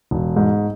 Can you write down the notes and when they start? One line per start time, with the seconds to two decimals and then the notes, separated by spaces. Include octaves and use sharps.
0.11 E1
0.36 G#2